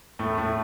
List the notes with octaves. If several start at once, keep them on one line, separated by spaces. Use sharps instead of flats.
A2 A3
A2 A3